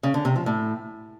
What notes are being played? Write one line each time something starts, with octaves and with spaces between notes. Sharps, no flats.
C#3
D3
C3
F3
A2